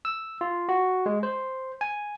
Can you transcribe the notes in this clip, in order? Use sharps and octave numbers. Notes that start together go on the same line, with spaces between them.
E6
F4
F#4
G#3
C5
G#5